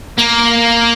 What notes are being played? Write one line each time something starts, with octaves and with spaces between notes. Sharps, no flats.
A#3